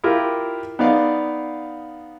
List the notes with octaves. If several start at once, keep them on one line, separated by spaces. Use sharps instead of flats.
E4 F4 G4 A#4
B3 D#4 D5 F5